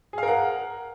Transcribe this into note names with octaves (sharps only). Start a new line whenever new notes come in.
G#4 A#4 F5 F#5